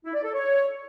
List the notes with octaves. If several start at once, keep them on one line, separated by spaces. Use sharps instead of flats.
E4
D5
A4
C#5